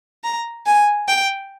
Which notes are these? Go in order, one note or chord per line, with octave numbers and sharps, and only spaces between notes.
A#5
G#5
G5